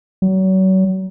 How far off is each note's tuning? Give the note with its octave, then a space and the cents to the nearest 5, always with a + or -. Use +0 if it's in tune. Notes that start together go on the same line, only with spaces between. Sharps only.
F#3 +35